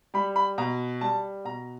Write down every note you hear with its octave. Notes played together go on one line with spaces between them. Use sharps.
G3 B5
B5
B2 A#5
G3 A5
B2 A#5